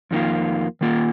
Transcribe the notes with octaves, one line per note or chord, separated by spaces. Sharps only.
F2 D#3 A#3 F4
D#3 A#3 F4